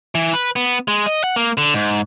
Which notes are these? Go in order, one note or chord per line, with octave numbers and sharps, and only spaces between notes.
E3
B4
B3
G#3
D#5
F#5
A#3
D3
G#2